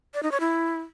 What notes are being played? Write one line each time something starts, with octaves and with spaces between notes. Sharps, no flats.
D5
D#4
C#5
E4